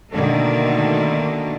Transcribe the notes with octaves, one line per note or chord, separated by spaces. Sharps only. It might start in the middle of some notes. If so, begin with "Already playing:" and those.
B2 D3 D#3 A3 A#3